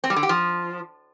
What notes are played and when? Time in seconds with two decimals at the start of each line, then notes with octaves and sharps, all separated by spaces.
0.04 C4
0.10 G3
0.16 D3
0.23 G4
0.29 F3